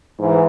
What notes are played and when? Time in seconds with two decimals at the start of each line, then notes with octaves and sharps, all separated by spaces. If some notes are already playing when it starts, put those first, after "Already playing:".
0.18 G#2 E3